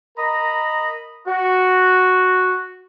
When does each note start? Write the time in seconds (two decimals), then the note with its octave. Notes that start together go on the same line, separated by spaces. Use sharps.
0.17 A#4 D#5 A#5 B5
1.27 F#4